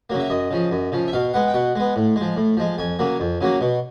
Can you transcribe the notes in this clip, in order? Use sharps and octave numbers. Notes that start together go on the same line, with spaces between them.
C#3 F#3 A#3
E5
F#2 D#5
C#3 F3
F#2
C#3 F3
E5
B2 F5
G#3 B3 F#5
G5
B2 F#5
G#3 B3
A2
G#3
F3
A2
F3 G#3
F2 G#5
C#3 F#3 A#3
F2
C#3 F#3 A#3
B2